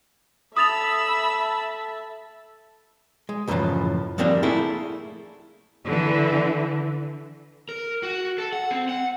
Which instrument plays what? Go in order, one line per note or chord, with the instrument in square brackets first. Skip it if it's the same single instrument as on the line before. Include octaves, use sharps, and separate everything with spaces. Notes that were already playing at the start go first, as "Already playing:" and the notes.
[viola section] A4 E5 A5 [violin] B5 E6 [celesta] D#6 A6 F7
[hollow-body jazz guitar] G#3
C#2 F#2 A2 D3 E3 F3
F3 G3 A#3 C4 D4
A3 A#3 E4 G#4 A4
[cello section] D3 E3
[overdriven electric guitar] A#4
F#4
A4
F#5
C4
F#5